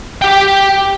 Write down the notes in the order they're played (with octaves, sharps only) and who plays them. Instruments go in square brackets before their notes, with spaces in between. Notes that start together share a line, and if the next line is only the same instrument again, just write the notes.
[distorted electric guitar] G4 G5